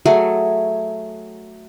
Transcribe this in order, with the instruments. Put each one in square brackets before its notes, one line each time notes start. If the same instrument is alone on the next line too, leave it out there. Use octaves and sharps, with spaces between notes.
[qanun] F#3 A3 G#4